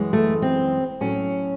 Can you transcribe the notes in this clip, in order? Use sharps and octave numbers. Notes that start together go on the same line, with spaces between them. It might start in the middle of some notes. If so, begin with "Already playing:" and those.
Already playing: F#2 E3 G#3
A3
C4
A2 F#3 C#4